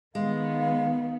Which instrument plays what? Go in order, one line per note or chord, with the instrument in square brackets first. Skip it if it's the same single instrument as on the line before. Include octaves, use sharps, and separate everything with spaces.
[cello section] D#3 B3 [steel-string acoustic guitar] G#3 [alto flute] F5